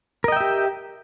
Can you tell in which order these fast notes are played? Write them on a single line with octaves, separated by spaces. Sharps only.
A#4 D#5 G5 E5 G4